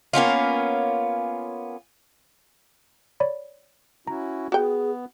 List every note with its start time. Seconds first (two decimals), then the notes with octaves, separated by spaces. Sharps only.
0.13 A#3 B3 C#4 F4
3.20 C#5 D5 B5
4.07 C#4 E4 F#4 A#5
4.52 B3 F#4 G#4 G5